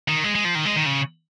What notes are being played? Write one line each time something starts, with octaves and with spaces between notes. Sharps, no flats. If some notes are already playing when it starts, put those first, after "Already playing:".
D#3
G#3
G#3
F3
D#3
G#3
D#3
C#3